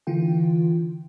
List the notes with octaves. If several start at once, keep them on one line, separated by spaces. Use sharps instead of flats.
D3 E3 F4 G5